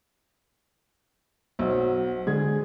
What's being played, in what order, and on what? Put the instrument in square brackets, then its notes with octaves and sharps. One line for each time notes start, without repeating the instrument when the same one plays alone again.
[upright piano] B1 [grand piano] F#4 C5 E6
[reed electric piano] D3 G#3 [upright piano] G#4 [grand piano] G#6